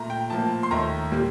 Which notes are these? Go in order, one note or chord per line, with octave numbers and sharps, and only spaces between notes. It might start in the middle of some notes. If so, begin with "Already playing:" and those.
Already playing: A#2 A3 A#5
G5
A2 F3 A#3 A5
C6
D#2 D#3 A3 A#5
A#2 G3 A#3